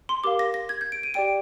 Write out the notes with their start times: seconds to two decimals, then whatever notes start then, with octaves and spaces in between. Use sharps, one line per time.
0.09 C6
0.24 G4 A#4 F5 D6
0.39 A#6
0.54 A#6
0.69 G#6
0.81 G6
0.92 D7
1.03 D#7
1.14 G4 D5 G5 D7